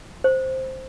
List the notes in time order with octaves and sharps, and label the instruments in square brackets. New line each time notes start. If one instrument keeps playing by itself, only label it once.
[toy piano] C5